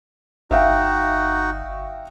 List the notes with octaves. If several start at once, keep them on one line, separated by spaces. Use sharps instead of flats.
G1 D#4 F#4 E5 F5 G5